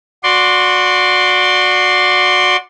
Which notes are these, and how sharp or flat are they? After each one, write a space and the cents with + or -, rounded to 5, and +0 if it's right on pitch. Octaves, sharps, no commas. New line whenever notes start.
F#4 -20 D5 +0 C6 +0